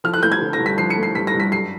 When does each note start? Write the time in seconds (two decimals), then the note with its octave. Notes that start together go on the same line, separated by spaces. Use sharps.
0.04 F3 F6
0.14 F#6
0.23 A3 G6
0.32 G#6
0.41 D3
0.53 A#6
0.60 G2
0.66 B6
0.78 F3 C7
0.90 C#7
0.97 A3
1.03 C7
1.15 G2 B6
1.27 A#6
1.34 G2
1.40 B6
1.52 F#2 C7